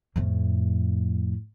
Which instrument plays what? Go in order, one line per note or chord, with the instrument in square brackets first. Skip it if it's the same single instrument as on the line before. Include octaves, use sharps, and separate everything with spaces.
[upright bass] F2 A2